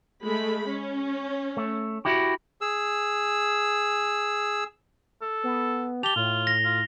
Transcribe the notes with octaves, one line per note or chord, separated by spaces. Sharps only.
G#3 A3 B5
C#4
A3
E4 F#4 G4
G#4 E6
A4
B3
G4 A5 F7 G7
A2 F4
A#6
F4